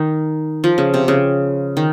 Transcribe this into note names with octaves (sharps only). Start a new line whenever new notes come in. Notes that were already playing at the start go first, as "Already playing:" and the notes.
Already playing: D#3 D#4
F3
C#3
C3
C#3
D#3